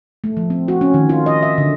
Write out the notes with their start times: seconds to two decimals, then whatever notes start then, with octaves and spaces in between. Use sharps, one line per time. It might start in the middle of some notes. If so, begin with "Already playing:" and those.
0.24 A3
0.37 F3
0.50 C4
0.68 F#4
0.81 C#4
0.94 D#3
1.09 F4
1.26 D#5
1.43 E5
1.58 D3